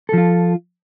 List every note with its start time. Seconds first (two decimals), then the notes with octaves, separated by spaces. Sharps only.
0.09 A4
0.13 F3
0.18 F4